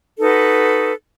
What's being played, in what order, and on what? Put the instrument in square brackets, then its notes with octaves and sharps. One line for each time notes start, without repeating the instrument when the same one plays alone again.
[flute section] D#4 F#4 A4 B4